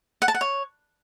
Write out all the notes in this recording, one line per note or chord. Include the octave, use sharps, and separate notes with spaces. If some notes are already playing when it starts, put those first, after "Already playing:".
F#5
A5
F#5
C#5